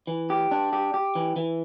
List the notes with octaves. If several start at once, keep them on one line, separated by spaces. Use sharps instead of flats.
E3
G4
D4
G4
G4
E3
E3